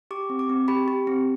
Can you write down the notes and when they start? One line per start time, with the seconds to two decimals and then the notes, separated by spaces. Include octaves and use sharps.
0.11 G4 D6
0.30 C4
0.39 D6
0.49 C4
0.68 G4 B5
0.88 G4
1.07 C4